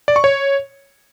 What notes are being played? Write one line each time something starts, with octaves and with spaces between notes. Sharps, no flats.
D5
C#6
C#5